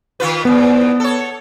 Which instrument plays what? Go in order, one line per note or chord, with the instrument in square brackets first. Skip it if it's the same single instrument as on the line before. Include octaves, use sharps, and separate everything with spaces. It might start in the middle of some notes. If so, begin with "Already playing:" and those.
[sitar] D#3 F4 B4
[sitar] E2 G#2 [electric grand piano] B3
[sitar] A4 C#5